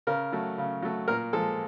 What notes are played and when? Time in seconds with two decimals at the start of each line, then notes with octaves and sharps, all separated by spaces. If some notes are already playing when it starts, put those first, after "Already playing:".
0.07 C#3 A#4
0.33 F#3 A3
0.58 C#3
0.82 F#3 A3
1.08 A#2 A#4
1.33 F3 G#3 A4